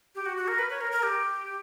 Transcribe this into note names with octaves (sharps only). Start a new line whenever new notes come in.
G4
F#4
F#4
A#4
B4
C#5
A#4
A#4
G4